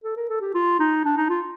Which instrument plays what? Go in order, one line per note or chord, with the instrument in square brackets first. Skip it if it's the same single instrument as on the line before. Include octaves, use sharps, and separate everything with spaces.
[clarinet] A4
A#4
A4
G4
F4
D#4
D4
D#4
F4